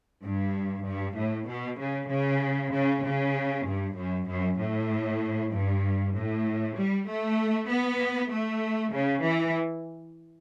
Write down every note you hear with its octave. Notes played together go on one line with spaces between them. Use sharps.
G2
G2
A2
B2
C#3
C#3
C#3
C#3
G2
F#2
F#2
A2
G2
A2
G3
A3
B3
A3
C#3
E3